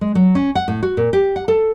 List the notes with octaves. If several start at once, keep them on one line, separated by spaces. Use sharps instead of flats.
G#3
F#3
C#4
F#5
A2
F#4
A#2
G4
F#5
A4